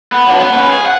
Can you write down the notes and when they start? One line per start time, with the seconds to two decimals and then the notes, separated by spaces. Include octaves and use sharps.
0.12 B3
0.27 F#3 D4
0.40 B3
0.54 C#4 B4
0.70 G#4
0.86 F#5